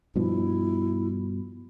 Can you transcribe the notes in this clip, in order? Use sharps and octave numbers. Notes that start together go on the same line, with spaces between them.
G2 B2 F3 E4